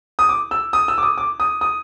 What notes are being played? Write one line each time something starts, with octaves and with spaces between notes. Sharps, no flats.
D#6
D6
E6
D#6
E6
D6
D#6
D6
D#6
D#6